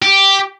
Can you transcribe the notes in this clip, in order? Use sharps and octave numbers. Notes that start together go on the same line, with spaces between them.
G4